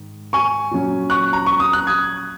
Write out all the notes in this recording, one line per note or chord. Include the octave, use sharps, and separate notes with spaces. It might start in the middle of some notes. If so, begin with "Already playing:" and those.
Already playing: G#2 D#3
G#5 C#6
A#2 F#3 C#4
C#6 F#6
A#5
C#6
D#6
F#6
D#6 G#6